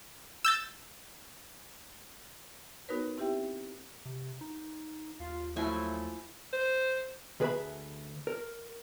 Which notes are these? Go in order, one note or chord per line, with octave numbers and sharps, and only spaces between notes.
E6 G6 A6
B3 D#4 F#4 A#4 B4 C#5
C4 E4 G4 E5 G5
C3
D#4
D#2 F4
F3 F#3 A3 E4 G#5
C5
D2 G#4 B4 D#5 E5 B5
A#4